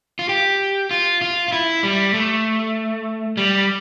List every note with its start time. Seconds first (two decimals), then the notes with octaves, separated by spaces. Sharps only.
0.19 F4
0.29 G4
0.91 F4
1.22 F4
1.48 F4
1.53 E4
1.83 G3
2.14 A3
3.37 G3